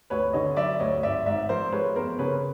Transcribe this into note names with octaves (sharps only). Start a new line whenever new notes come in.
D2 B4 C#5
D3 C#5 D#5
F#3 D5 E5
D2 C#5 D#5
G#1 D5 E5
G#2 D5 E5
F3 A#4 C5
G#3 B4 C#5
E2 A#4 C5
C#3 B4 C#5